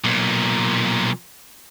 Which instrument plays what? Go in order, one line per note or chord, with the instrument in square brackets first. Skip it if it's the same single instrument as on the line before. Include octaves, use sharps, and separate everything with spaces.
[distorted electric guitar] B1 A#2